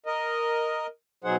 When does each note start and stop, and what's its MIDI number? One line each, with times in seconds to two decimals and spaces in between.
0.06 0.86 70
0.06 0.86 75
1.24 1.36 47
1.24 1.36 54
1.24 1.36 63
1.24 1.36 68
1.24 1.36 72
1.24 1.36 78